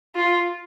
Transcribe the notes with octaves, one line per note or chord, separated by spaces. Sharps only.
F4